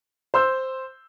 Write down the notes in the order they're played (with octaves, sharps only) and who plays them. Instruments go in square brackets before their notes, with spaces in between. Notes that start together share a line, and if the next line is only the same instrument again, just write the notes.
[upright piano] C5 C6 E6 G6